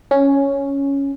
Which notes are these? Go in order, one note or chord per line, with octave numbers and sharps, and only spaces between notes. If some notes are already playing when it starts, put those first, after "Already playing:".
C#4